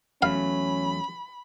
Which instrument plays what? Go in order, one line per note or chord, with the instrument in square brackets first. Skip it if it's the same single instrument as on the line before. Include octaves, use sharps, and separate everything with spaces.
[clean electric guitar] E2 F#3 A3 [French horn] C#4 [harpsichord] F5 [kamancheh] B5